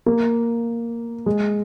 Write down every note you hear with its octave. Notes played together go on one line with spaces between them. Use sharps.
A#3
G#3